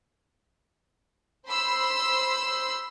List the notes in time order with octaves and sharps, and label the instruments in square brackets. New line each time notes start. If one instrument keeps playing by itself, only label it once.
[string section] C5 B5 C6 E6